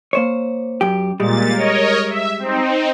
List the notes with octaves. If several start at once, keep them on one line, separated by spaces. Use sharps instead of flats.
A#3 C5 C#5
F#2 G4
A#2 G3 G#3 A6
A#4 C#5 D#5
E5
C4 D#4